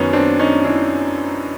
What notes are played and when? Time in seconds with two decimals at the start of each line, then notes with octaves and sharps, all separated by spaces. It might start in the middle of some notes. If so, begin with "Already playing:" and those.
Already playing: F#2 D#3 B3 C#4
0.13 C4 D4
0.39 C#4 D#4
0.65 D4 E4